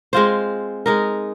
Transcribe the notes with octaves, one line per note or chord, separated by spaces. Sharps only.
G#3 C4 F4 C5
G#3 D#4 A#4